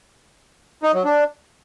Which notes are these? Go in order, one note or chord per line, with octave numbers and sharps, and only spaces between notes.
D#4
F#3
D4